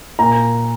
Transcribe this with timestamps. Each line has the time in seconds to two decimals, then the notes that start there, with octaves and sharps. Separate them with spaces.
0.19 A#2 A#5